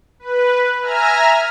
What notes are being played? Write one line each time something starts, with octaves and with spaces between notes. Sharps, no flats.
B4
E5 G#5 A#5 F6